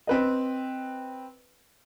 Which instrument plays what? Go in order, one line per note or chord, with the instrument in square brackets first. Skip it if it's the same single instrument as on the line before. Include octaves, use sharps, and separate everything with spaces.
[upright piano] C4 B4 D#5